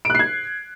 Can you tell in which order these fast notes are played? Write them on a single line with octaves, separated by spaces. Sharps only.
D7 F#6 C7 G#6